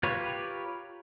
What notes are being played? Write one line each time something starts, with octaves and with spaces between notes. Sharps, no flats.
F4 G4 A#4 B4 C#5